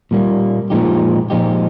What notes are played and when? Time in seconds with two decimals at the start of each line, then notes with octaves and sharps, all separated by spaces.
0.11 A#2 G3 A#3
0.70 A#2 F3 G#3 D#4 G4
1.30 A#2 F3 G#3 D#4 G4